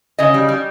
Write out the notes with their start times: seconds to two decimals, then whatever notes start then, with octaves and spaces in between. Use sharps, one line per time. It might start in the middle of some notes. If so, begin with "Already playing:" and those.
0.19 C#3 D#5
0.34 G3
0.49 G3